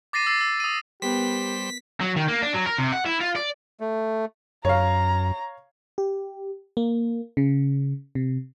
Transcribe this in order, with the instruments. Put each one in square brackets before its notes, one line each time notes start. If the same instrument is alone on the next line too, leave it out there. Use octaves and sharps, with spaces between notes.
[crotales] D6 A6 A#6 C7 D#7
E6 A6 C7
E6
D#6 D#7
[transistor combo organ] G3 C5 [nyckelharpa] B3 A#4 [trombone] G4 [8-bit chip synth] B6
[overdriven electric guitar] F#3
D#3
A#3
D4
F#3
A#4
C3
F#5
E4
F4
D5
[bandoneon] A3
[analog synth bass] F#2 [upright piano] C#5 F5 [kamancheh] A#5
[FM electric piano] G4
A#3
C#3
C3